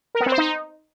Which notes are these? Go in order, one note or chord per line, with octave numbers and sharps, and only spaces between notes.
A#4
B3
C4
C5
D#4